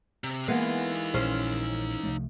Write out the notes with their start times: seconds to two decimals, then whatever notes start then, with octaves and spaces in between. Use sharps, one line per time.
0.24 C3
0.48 E3 G#3 A#3 B3 D#4 F5
1.14 A#1 C#4 C5
2.03 C2 F3 A3